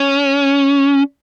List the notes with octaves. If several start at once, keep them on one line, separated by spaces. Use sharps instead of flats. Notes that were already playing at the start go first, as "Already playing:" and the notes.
Already playing: C#4